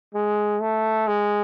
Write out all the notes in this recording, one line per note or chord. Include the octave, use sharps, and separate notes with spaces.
G#3
A3
G#3